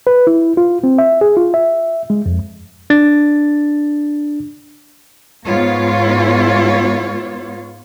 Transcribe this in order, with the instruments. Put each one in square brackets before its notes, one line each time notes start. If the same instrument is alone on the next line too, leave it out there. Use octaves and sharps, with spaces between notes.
[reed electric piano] B4
E4
F4
C4
E5
G#4
F4
E5
G#3
F2
D4 A6
[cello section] G#2 B3 F4 C#5